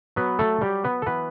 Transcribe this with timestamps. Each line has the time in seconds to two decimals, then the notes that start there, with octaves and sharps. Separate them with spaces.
0.16 F#3 B3 B4
0.39 A3 A4
0.61 F#3 G3 G4
0.84 B3 B4
1.02 A4
1.06 E3 B3 B4